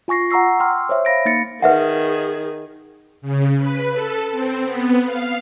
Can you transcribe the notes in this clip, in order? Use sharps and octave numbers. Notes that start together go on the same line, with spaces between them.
F4 G#5 C#6 A#6 C7
F#5 A#5 C#6 E6 C7
G5 C6 D6 E6 F6
C5 C#5 E5
F5 B5 A#6 D7
A#3 D#4 A6 C#7
D#3 G#4 B4 E5 F#5
C#3
B4
A4
C4
B3
F5